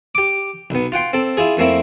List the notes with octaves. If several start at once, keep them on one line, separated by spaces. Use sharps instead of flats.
G4 D6
B1 B3
F4 F#5 G5 C6
C4 A4
E4 F4 G#4
F2 A3 A#3 C4 E4